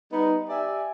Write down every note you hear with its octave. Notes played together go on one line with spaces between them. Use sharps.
G3 B3 D#4
G4 D5 E5 G#5